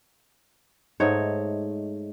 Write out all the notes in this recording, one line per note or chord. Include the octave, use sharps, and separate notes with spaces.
G#2 A3 D#4 C#5